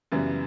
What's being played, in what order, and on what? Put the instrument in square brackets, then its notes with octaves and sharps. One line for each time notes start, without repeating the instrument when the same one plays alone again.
[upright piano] F#2 C#3 E3 G3 B3